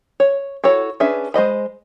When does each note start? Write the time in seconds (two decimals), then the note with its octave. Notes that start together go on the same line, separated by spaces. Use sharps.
0.20 C#5
0.64 E4 F#4 A4 C#5
1.00 C#4 D4 G#4 B4 E5
1.34 G#3 C5 D#5 B5